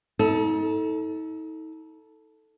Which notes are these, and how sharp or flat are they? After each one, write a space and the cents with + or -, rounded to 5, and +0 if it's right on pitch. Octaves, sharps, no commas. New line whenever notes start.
D#4 +40 A4 +0